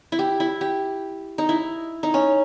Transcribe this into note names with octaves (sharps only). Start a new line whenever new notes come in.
E4
G4
E4
G4
D#4
E4
D#4
C#4